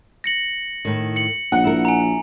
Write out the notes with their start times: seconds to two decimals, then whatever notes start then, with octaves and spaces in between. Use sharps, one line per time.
0.24 A#6 C#7 F#7
0.85 A2 D#3
1.16 C#7 F#7
1.52 A#1 D#4 F#5
1.64 E4 A#4
1.85 G#5 A#5